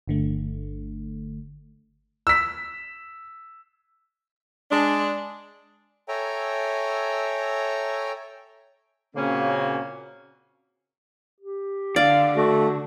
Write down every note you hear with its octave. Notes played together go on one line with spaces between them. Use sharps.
G1 D3 A3
E6 B6
G#3 D4
A4 C#5 E5 G5 G#5 A#5
A#2 C#3 A#3 C4 C#4 F#4
G4
D3 D5 F5
A3 F#4